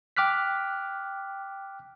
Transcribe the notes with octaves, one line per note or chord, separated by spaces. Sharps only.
G5 D6 F6 F#6 B6